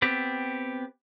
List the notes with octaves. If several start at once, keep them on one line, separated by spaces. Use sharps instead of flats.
B3 C4 G4